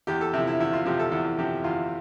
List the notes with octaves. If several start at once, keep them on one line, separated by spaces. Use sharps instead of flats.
E2 G4
A4
C3 F3 E4
E4
E2 E4
F4
C3 F3 G4
A4
E2 A4
C3 F3 G4
E2 F4